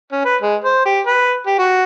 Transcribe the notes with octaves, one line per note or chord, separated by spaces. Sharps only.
C#4
B4
G#3
C5
G4
B4
G4
F#4